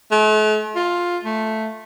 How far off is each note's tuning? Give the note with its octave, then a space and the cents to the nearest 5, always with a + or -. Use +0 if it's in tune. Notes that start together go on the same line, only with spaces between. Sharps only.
A3 -45
F4 +10
A3 -5